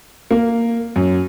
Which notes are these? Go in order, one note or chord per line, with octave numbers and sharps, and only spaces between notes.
A#3
F#2